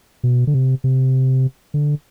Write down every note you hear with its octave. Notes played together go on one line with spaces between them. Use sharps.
B2
D3
C3
C3
D3